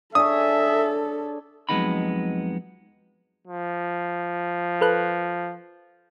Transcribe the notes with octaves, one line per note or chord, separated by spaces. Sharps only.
D4 G#4 A4 C#5 E5 D#6
F2 F#3 G#3 B3 D#4 B5
F3
A4 B4 F#6